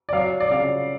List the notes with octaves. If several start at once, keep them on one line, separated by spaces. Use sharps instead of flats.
D5
F#3 F5
D5
C#3 F5